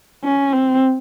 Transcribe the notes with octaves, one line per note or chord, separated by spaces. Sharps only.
C#4
C4